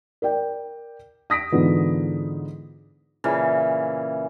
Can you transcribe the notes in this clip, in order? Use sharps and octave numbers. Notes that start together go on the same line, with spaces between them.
A#4 D5 G5
D#6 A#6 B6 D7
G#2 D3 E3 B3 F4
A#2 C#3 E3